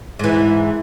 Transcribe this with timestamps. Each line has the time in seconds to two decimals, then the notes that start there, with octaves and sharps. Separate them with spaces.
0.19 G#2 E3